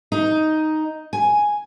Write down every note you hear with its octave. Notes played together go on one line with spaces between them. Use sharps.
D#4
G#5